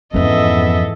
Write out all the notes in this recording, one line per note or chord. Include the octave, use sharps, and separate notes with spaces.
F2 G#2 E3 B3 C#4 A4 D#5 E5